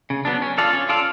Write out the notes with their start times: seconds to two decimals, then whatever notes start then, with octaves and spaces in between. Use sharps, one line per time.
0.10 C#3
0.25 F#3 B3 D4
0.42 C#4
0.58 F4 A4 D5 F5
0.73 C#4
0.89 F4 A4 D5 F5